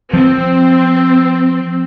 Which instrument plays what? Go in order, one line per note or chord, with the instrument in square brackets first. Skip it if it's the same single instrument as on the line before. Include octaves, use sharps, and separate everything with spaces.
[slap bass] F3 [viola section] C4